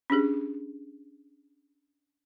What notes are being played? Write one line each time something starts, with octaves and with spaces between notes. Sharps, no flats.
C#4 D4 G4 G#4